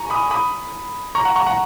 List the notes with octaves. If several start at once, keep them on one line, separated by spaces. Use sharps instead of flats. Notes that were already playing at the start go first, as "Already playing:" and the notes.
Already playing: G#5 A#5 C#6
B5 D#6
B5 D#6
A#5 C#6
F#5 A#5
A#5 C#6
F#5 A#5